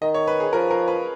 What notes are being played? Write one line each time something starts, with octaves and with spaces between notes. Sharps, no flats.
D#3 D#5
C#5
B4
G#4
F3 A#4
A#4
B4